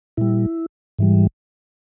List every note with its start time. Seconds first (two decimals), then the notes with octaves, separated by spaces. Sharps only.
0.17 A#2 G3 E4
0.99 G#2 E3 G3